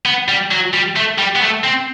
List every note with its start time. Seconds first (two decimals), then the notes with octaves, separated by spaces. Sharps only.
0.06 B3
0.28 G3
0.51 F#3
0.74 G3
0.96 A3
1.19 G3
1.36 B3
1.41 A3
1.64 C4